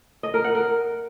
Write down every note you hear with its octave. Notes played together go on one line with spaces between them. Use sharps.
D#5
A#4
F#5
A#4